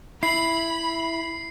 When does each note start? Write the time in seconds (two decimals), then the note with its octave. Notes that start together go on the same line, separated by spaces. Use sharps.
0.23 E4 B5 C7